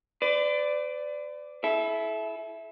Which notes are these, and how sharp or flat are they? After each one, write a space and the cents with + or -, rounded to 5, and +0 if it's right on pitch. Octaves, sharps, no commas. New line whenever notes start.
B4 +45 D5 +0
E4 +0 A4 -40 E5 +0